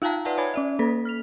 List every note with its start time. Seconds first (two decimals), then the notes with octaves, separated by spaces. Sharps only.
0.02 D#4 F4 F5 G5 A5 A#5
0.25 B4 D5 E5 F#5 G#5 A5
0.37 C#5 G#5 B5 G#6
0.54 C#4 D5 E5
0.79 A#3 A4 B6
1.05 F6 B6 F7